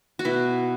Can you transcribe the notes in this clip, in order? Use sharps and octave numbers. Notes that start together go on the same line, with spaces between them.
F#4
B2 E4